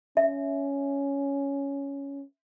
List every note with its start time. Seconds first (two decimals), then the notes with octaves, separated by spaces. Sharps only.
0.17 C#4 E5